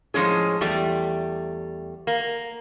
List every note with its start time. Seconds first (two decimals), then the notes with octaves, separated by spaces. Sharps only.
0.14 A2 F3 G#3 C#4 G#4
0.61 E2 G3 A3
2.07 A#3